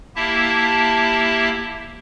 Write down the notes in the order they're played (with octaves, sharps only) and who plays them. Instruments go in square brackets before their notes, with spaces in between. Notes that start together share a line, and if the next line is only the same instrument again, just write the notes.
[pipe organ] A#3 E4 G4 E5 A5